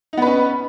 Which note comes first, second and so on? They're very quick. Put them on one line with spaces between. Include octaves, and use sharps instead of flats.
D#4 B3 B4 C#4